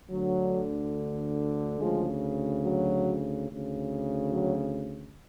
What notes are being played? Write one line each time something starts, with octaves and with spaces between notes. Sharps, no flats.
D2 D3 F#3
D2 C#3 F3 G#3
F#3
D2 C#3
F#3